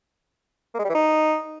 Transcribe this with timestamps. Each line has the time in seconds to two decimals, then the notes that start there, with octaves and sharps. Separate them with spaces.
0.74 A#3
0.79 G#3
0.84 G3
0.90 E3
0.95 D#4